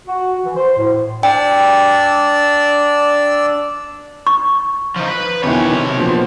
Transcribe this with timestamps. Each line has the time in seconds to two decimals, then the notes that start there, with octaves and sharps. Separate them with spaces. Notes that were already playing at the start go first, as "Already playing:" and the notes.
0.07 F#4
0.44 E3
0.56 C5
0.77 A2
1.23 D4 D5 G5 E6
4.27 C#6
4.96 F3 D#4
5.08 B4
5.43 E2 B2 D#3 E3 C#5
5.71 C3
5.97 A#2 F3